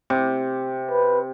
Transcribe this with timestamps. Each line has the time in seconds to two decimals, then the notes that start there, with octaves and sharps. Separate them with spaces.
0.10 C3
0.91 B4